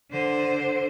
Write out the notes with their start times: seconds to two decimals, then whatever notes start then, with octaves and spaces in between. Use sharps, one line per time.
0.11 D3 C5